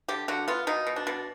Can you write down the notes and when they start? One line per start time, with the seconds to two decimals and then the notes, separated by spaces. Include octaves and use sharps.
0.08 D3 G4
0.28 D3 F#4
0.48 B3 F4
0.67 B2 D#4
0.87 B2
0.96 D4
1.07 B2